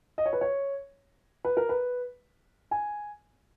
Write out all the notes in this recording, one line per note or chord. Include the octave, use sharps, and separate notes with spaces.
D#5
C#5
B4
C#5
B4
A#4
B4
G#5